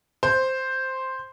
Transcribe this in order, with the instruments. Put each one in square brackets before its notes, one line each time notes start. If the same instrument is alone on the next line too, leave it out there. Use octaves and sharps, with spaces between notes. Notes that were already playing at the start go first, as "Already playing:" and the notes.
[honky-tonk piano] C5